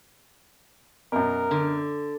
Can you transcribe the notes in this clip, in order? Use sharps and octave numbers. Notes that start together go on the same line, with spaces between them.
F#2 B2 A#4
D3